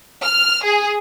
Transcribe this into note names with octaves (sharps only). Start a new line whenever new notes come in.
F6
G#4